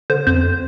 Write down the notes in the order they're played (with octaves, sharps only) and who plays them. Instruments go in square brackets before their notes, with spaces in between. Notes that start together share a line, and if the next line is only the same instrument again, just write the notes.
[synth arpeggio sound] D3 C5
F2 C5